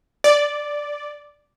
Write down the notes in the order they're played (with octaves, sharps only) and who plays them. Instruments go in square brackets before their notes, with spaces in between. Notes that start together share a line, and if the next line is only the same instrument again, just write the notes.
[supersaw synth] D5